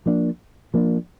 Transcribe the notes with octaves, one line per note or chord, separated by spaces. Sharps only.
F3 A#3 D4
F3 A#3 D4